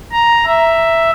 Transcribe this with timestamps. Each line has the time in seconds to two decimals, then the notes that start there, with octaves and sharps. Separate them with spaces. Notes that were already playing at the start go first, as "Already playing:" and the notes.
0.12 A#5
0.46 E5